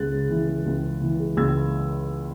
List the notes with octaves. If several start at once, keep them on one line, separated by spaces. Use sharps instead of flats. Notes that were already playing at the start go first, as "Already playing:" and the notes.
Already playing: C#2 G#3 F#6 A6
C#3
E3
G#3
C#2
C#3
E3
G#3
C#2 E6 G#6